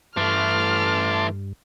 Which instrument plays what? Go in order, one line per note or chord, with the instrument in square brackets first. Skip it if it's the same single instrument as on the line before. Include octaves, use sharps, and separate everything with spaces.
[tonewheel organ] G2 [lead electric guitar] E3 A3 [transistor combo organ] A5 C6 D6 [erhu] F6